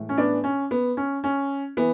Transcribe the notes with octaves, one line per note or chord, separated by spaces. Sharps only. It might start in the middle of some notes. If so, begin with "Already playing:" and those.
Already playing: A2 E3 G#3
C#4
B3 D4
C#4
B3
C#4
C#4
E3 B3